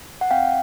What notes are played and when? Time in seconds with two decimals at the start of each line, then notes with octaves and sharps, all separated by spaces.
0.21 F#5
0.31 C4 F5 G5